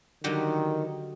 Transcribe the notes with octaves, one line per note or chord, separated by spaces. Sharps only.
D3 D#3 F#3 G3